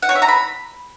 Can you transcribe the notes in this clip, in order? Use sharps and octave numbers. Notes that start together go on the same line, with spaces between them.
F#5
C#5
E5
A#5
B5